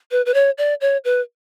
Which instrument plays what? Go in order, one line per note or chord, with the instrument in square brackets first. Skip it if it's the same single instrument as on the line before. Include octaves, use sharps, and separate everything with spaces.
[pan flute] B4
B4
C#5
D5
C#5
B4